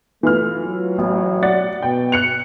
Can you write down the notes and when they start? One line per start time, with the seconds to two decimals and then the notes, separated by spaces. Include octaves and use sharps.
0.23 E3 A3 F4 F6
0.59 F#3
0.98 A1
1.43 D5 F#5 A6
1.82 B2 G5
2.12 F#6 C#7 F7